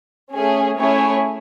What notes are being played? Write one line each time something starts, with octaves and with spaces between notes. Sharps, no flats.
A3 C#4 G#4
A3 C#4 E4 G#4 C#5